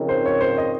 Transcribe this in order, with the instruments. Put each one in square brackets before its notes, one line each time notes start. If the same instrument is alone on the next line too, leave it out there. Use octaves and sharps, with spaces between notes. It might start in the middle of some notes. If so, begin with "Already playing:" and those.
Already playing: [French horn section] C#3 F3 C4 D#4 A#4
[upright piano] C5
C#5
C5
D#5